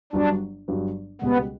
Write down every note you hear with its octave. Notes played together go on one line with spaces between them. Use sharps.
G1 G2 F#3 D4
G1 G2 F#3
C#2 B2 G3 B3